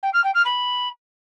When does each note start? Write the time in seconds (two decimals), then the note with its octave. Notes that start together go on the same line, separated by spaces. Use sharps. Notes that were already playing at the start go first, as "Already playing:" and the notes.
0.02 G5
0.13 F6
0.23 G5
0.34 F6
0.45 B5